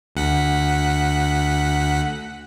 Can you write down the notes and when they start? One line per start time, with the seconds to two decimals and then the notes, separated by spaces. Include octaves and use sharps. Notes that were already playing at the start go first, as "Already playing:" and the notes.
0.15 D2 F#5 B6